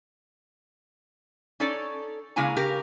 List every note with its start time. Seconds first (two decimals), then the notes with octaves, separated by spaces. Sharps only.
1.60 C#4 D#4 A4 C#5 D5
2.36 C#3 G#3 A#3 E4 G#5 A#5
2.56 C#3 G4 A#4 A#5